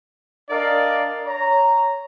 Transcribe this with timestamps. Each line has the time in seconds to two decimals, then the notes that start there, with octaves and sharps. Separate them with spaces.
0.50 D4 A#4 D5 D#5 F5
1.25 C#5 A#5